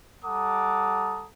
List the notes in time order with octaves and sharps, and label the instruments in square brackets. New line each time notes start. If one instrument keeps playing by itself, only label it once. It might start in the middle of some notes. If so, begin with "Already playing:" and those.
[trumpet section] G3 A4 F#5 A#5 D6 D#6